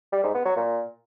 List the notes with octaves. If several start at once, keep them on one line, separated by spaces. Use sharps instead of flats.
G3
G#2
B3
F#3
A#2